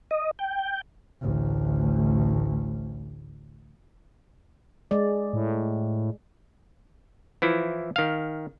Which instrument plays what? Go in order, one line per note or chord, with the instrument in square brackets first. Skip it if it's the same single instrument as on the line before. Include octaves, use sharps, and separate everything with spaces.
[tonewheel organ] D#5
G5
[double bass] A1 D2
[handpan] G#3 D5
[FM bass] A2
[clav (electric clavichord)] E3 F3 E4
D#3 F5